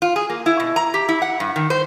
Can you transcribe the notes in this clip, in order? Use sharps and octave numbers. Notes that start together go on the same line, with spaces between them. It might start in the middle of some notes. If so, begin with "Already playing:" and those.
F4
G#4
A#3
E4
B2
A#5
G4
E4
F#5
G2
D#3
C5